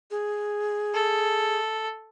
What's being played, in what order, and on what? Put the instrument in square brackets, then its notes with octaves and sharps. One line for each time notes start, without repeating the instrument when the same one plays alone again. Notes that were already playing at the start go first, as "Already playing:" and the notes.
[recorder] G#4
[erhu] A4